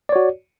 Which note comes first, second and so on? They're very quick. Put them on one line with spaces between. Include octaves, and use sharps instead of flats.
D5 C#5 F#4